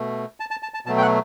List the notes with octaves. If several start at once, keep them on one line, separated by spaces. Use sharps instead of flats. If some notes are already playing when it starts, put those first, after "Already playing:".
Already playing: B2 A3
A5
A5
A5
A5
B2 F#3 A3 A5
G5
F#5